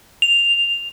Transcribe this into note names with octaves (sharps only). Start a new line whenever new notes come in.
F7